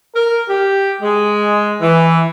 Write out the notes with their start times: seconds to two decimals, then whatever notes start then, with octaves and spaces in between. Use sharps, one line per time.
0.15 A#4
0.48 G4
1.01 G#3
1.81 E3